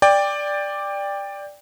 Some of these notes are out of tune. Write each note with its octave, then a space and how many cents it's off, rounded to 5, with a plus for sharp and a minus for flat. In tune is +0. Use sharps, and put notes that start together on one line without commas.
D5 +0 G5 +20